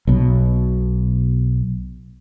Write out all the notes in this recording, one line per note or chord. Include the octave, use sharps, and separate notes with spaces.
B1 B2